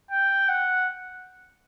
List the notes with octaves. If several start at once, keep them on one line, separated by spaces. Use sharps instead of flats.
G5
F#5